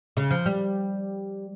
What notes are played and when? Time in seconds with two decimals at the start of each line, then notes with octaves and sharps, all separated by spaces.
0.17 C#3
0.31 F3
0.46 G3